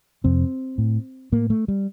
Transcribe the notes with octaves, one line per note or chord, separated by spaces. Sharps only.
F2 C3 C4
A2
A2 A#3
A3
G3